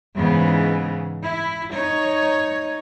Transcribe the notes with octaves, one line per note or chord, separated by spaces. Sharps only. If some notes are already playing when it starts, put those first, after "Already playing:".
G#2 C#3 E3 B3
E4
D#4 C#5